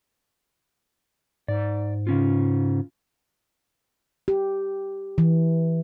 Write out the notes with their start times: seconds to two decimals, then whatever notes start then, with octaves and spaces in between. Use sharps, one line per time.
1.48 G#2 D5
2.07 C#3 C#4 F4
4.28 G4
5.18 E3